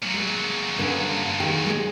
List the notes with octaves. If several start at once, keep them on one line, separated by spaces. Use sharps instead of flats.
A#2 F#3
G#3
G2 D3 C#4
D#3 G#4 G5
G#3 G#4